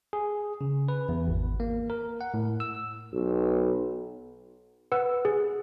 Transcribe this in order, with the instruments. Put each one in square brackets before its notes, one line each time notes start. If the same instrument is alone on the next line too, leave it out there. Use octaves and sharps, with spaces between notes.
[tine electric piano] G#4
C#3
B4
E2
G#1
A#3
A#4
F#5
A2
E6
[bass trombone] B1
[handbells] B4 F#5 E6
G#4